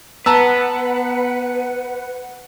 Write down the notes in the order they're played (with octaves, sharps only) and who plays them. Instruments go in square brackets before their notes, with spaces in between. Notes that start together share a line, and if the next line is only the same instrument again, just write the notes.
[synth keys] B3 [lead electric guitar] B4 [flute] F#5 [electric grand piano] A5 A#5 E6